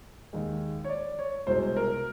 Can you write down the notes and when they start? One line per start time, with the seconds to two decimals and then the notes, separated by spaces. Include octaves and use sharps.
0.33 D#2 D#3 G#3
0.84 C#5
0.89 D5
1.19 C#5
1.47 C2 B2 G#3 C5
1.76 A#4